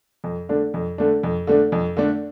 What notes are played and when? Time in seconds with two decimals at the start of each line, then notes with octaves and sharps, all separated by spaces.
0.24 F2
0.49 D3 A3 D4
0.74 F2
0.98 D3 A3 D4
1.23 F2
1.47 D3 A3 D4
1.72 F2
1.97 D3 A3 D4